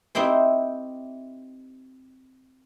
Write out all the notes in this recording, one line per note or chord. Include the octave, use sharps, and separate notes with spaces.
C4 D#4 E4 G4 C5